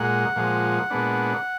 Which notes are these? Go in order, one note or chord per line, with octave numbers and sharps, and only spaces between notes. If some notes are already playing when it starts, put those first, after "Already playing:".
Already playing: A#2 G#3 F#5
A#2 F3 G#3
A#2 G#3 B3 D4